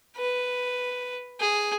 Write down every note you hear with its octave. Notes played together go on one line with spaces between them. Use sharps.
B4
G#4